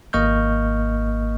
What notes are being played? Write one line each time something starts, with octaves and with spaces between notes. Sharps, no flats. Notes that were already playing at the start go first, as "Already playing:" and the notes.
G#1 A#3 D#5 C#6 F6 G6